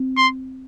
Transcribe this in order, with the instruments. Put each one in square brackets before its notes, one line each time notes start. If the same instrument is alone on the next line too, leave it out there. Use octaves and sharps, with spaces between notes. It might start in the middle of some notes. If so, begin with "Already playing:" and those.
Already playing: [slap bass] C4
[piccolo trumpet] C6